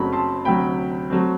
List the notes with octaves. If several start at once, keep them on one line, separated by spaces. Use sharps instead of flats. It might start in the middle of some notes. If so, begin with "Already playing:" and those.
Already playing: F#1 F#2 F#3 A3 C4 B5
A5 C6
D2 C3 F#3 G5 B5
F#3 A3 C4